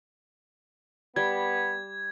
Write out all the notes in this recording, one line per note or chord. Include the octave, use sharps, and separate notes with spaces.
G3 B3 G#6